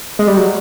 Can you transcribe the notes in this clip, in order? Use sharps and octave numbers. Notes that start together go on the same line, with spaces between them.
G#3
G3
F#3